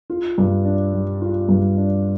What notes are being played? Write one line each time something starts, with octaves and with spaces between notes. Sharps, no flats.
F4
G2
D4
G3
F4
G2
D4